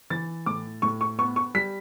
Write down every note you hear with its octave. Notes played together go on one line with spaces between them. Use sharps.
E3 A6
A2 D6
A2 C#6
C#6
B3 C#6
C#6
G3 B6